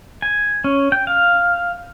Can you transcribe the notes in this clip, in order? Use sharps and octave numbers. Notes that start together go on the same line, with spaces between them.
G#5
C#4
G5
F5